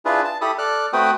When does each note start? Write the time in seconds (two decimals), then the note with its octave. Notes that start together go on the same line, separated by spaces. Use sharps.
0.05 D4 E4 F4 G#4 B4
0.25 A5
0.41 E4 G4 A4 B5 D#6
0.58 A4 D5 F6 F#6
0.93 A3 C4 F#4 B4 G5 D#6